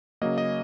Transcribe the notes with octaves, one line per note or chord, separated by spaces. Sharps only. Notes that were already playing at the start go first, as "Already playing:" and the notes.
C#3 F#3 A#3 D#5
D#5